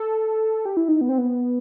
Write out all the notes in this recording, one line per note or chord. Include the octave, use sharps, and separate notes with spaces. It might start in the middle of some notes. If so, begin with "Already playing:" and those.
Already playing: A4
G4
E4
D#4
B3
C4
B3